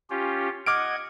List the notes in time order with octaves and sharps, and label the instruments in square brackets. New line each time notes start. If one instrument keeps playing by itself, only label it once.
[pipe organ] C#4 F4 G4
[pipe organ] D#5 F#5 G#6 [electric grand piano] D6 F6 D7